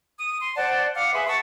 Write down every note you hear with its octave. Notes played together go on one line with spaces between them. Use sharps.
D#6
C6
C5 D5 F#5 A5
F5 F#5 D6 F6
G#4 B4 E5 C6
F#5 A5 C#6 E6